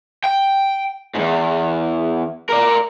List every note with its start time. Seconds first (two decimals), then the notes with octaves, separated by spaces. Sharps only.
0.24 G5
1.15 E2 G#2
2.49 A#4 D5